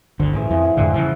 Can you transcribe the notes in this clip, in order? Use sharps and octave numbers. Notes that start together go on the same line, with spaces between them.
G1 D2 D3 C5
A1 E3 G#4 D6
F2 E5 F5 G#5
G#4 F5 F#5
F2 G#2 D3 E5 F#5 G5
C#3 E3 F3